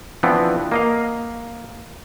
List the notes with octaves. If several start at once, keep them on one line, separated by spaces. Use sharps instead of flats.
E3 F3 B3 C4 D4
A#3 D#5 F5